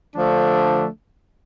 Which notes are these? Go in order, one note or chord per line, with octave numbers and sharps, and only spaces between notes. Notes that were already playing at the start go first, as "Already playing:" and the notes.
D3 F3 A3 D4